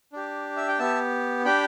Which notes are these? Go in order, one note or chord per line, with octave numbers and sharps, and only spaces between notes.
D4 G4
E5
G5
B3 G4 E5 A5
D4 G4 G5 B5